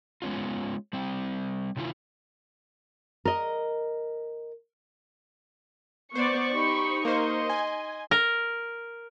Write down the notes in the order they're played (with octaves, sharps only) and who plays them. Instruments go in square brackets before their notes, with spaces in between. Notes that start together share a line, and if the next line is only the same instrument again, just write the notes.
[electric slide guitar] G#3 B3 C#4 F4
G3 C4
C3 D#3 E4 F4
[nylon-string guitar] A#4 D#5
[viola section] B3 D5 [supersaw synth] C5 [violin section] C#6
[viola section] D#4 [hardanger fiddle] G4 B5
[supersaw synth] A#3 C5 [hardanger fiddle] D#5 C6
[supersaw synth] G#5
[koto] A#4